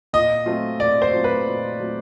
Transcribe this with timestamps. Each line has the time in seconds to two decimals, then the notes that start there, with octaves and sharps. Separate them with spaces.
0.13 A#2 D#5
0.46 F#3 A3 C4 F4
0.80 A#2 D5
1.02 C5
1.13 F#3 A3 C4 F4
1.24 B4
1.46 A#2
1.79 F#3 A3 C4 F4